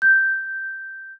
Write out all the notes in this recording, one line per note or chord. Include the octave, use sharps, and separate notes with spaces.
G6